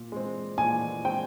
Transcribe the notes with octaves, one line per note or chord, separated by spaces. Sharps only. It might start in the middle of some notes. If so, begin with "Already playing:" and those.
Already playing: A#2
G#3 C4
A#2 G#5
G#3 C4 G5